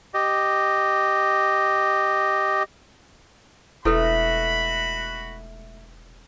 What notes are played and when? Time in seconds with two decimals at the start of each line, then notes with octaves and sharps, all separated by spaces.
0.14 G4 D#5
3.85 E1 A3 D#4 E4 F#4 A4 B4 B5